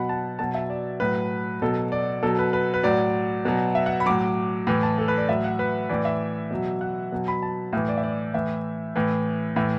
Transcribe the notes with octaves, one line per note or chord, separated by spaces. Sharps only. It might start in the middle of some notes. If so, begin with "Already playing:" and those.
Already playing: B2 F#3 F#5 B5
A5
B2 F#3 A5
E5
D5
A2 F#3 B4
B2 F#3 A4
D5
B2 F#3 A4
B4
B4
B4
A2 F#3 D5
B2 F#3
E5
F#5
B5
A2 F#3 D6
A2 E3
A5
A4
B4
D5
A2 F#3 E5
F#5
B4
A2 E3 D5
E5
B2 F#3
F#5
B2 F#3
B5
A5
A2 E3 E5
D5
E5
D5
A2 E3 E5
A2 E3
A2 E3 E5